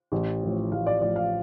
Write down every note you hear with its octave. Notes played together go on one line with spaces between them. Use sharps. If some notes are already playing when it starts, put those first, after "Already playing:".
A1
A2 F3
A1 F5
D5
A2 F3 D5
F5